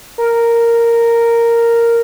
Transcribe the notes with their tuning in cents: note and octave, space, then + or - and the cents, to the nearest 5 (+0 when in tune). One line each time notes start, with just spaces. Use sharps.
A#4 -5